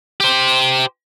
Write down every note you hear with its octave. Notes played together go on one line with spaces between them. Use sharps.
G4 C5